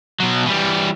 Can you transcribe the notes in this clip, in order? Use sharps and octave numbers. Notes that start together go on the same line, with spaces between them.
B2 F#3
E3 G3